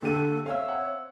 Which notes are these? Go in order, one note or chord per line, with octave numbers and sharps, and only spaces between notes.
D3 A#3 G4 A4 D#7
C4 C#5 E5 F5
F#5